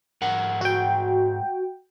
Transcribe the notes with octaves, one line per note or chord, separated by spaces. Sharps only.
G#2 A#4 F#5
F#4 G5